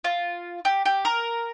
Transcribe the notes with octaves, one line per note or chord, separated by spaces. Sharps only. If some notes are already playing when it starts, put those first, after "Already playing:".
F4
G4
G4
A#4